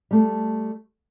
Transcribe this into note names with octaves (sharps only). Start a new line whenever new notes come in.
G3 A3